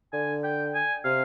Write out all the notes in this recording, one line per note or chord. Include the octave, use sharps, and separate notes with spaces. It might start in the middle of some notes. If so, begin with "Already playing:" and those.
D3 G#5
G5
G#5
C3 F5